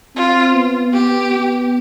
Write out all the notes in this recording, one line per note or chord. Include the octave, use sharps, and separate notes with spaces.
C4 F4
B3
B3 G4
B3